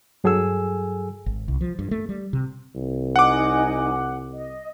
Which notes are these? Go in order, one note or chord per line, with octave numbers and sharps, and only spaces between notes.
G2 F#3 G#4 A4 G#5 E6
G#1
C2
F3
G2
A3
G3
C3
C2
D#4 F#5 G#5 D6
D#5